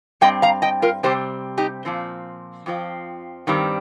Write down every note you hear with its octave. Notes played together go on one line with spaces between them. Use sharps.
G2 G3 C4 D#5 G5
F5 A#5
D#5 G5
F4 A#4
C3 G3 C4 G4 C5
D#4 G4
A#2 F3 C4
F2 F3 C4
G2 D#3 G3 C4